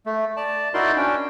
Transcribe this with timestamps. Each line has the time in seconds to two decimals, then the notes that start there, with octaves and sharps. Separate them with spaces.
0.06 A3
0.37 D5 A5
0.74 D#4 E4 F#4 A#4 D5 C6
0.97 C#4 D4 G5